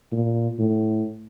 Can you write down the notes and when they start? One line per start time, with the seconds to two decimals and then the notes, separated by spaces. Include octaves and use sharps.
0.12 A#2
0.59 A2